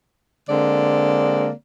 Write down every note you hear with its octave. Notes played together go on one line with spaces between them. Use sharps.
D3 G#3 A#3 C4 D5